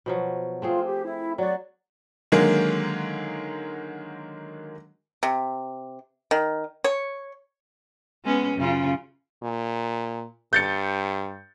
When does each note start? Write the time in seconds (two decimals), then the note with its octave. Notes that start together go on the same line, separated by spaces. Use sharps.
0.06 B2 F3 F#3
0.62 A3 C4 F4 G#4
0.85 G4
1.04 E4
1.38 F#3 F#4 D5
2.32 D3 D#3 F#3 G#3 A#3
5.23 C3
6.31 D#3
6.84 C#5
8.25 G#3 B3 C#4
8.57 F#2 C#3 F4
9.43 A#2
10.53 G2 G6 A6 C#7